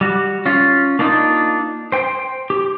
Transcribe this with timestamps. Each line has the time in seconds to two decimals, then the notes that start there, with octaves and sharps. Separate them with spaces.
0.01 G3 F#4
0.46 C#4 F4
0.99 A#3 D4 D#4 F4
1.92 C5 G5
2.50 G4